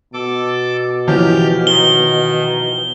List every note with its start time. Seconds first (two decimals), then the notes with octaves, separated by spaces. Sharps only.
0.14 B2 A4 D6
1.08 E3 F3 C#4 G4 F6 G6
1.67 D#3 G7